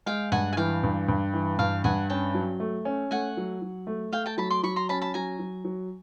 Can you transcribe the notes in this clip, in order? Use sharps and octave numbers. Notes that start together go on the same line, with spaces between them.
G#3 F5 G5
G2 F#5 G#5
G#5
E3 F5 G5
G2
G2
E3
G2 F5 G5
G2 F#5 G#5
C#4 G5 A5
F#3
A3
C#4
A3 F#5 G#5
F#3
F#3
A3
A3 F5 G5
G5 A5
F#3 A5 B5
C6 D6
F#3 B5 C#6
A#5 C6
C#4 A5 B5
A5 B5
F#3 G#5 A#5
F#3
F#3